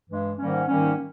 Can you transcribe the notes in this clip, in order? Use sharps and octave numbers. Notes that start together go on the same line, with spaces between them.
G2 E3 G#3
G#2 D#3 G3 A#3 C#4
G#2 D#3 G3 A#3 C#4